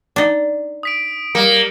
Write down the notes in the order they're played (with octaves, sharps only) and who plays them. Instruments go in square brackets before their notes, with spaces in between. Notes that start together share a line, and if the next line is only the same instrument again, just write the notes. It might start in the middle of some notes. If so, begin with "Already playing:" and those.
[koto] D4 D#4
[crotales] D#6 B6 D7
[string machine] G3 [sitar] A#3 [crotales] C#7